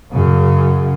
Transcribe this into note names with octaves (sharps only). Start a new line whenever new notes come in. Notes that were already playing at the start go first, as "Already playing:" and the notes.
F#2 C#3